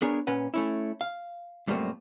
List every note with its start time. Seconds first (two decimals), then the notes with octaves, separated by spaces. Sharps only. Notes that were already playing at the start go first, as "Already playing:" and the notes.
0.02 B3 D4 G#4 A#4 C#5
0.27 A#2 C#4 B4 F#5
0.54 A3 C#4 E4
1.01 F5
1.68 F#2 A#2 G3 A3 A#3 C4